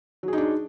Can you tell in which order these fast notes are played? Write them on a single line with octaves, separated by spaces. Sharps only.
F#3 G#4 D#4 D4